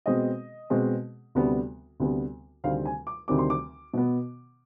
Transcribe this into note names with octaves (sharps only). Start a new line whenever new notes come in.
B2 G#3 C4 D#5
B2 G#3 C4
D2 C3 G3 B3
D2 C3 G3 B3
D2 C3 D#3 G3 C4 F5
G#5
D6
D2 C3 D#3 G3 C4 D6
C6
D6
B2 B3